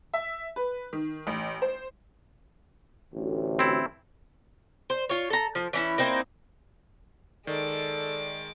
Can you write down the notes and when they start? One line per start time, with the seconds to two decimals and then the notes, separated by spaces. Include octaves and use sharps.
0.14 E5
0.56 B4
0.93 D#3
1.27 A1
1.62 C5
3.14 A1 D2
3.59 C4 E4
4.90 C5
5.09 F4 C#5
5.30 A4 A#5
5.55 F3
5.73 E3 C#4 E4
5.98 A#3 C4 D#4 E4
7.47 D#3 G#3 A4 D5 D6